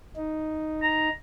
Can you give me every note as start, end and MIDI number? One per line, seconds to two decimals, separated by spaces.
0.16 1.09 63
0.82 1.11 82